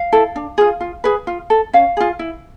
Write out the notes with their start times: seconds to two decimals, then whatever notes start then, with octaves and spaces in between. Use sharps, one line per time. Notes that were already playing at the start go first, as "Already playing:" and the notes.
Already playing: F5
0.12 E4 A4
0.36 D4
0.58 F4 G#4
0.81 F4
1.04 G#4 B4
1.27 F4
1.50 A4
1.73 C#4 F5
1.97 F4 G#4
2.19 E4